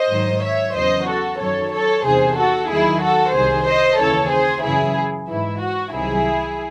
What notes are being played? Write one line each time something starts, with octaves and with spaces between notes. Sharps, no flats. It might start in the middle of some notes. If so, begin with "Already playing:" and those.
Already playing: C5 D#5
G#2 D#3 F#3
C#5 E5
E2 C#3 F#3 C5 D#5
F#4 A4
F#2 D#3 F#3 A4 C#5
A4 C#5
E2 C3 D#3 G#4 C5
F#4 A4
D#2 D#3 F#3 E4 G#4
F#4 A4
C2 C3 D#3 G#4 C5
C5 D#5
D#2 C#3 E3 A4 C#5
G#4 C5
F#2 C#3 E3 E4 G#4
G#2 E3 E4
F#4
C2 C3 D#3 F#3 E4 G#4